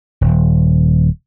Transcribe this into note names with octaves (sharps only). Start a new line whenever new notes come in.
D#1